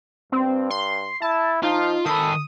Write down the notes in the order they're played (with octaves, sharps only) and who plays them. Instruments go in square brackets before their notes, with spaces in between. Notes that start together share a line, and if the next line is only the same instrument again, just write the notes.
[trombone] G2 [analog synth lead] C4
[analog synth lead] C6
[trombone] E4 [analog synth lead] A5
[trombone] F3 [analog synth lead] D#4 [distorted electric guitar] F4
[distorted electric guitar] D#3 B5 [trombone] A4 [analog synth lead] D#6